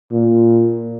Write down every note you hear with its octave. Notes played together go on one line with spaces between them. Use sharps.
A#2